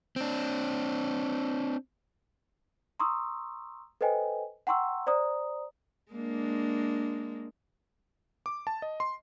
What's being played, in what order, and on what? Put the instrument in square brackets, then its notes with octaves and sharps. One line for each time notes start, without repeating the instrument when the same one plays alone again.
[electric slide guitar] C4 D4
[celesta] A#5 C6 C#6 D#6 E6
A4 B4 C5 D#5 G5 G#5
F#5 G5 A#5 C6 C#6 E6
C5 D5 A#5 D#6
[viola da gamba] G#3 A#3 D4
[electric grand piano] D6
A5
D#5
C6